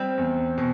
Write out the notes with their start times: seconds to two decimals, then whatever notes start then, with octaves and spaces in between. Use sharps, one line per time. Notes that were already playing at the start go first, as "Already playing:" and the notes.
Already playing: G3 C4
0.18 E2
0.58 B2